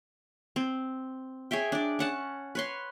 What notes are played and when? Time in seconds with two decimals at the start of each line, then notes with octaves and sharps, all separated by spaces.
0.56 C4
1.51 G#4 C#5 E5 G5
1.72 D4 D5
1.99 C#4 F#5 A5
2.55 B4 C#5 C6